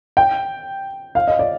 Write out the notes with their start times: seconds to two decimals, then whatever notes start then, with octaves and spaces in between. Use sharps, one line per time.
0.17 G5
1.15 F5
1.28 D#5
1.39 D5